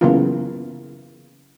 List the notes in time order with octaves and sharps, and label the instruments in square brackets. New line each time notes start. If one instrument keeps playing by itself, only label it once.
[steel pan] C#3 E3 F#3 A#3 B3 F4